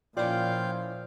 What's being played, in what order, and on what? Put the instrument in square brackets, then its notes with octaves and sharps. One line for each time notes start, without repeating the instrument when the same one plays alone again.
[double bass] A#2 F3 [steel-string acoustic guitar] C#4 E4 D5 [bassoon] F4 [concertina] F5 G5